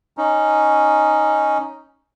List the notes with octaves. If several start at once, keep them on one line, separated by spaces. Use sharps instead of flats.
C#4 D#4